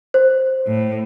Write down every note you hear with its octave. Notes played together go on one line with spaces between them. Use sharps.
C5
A2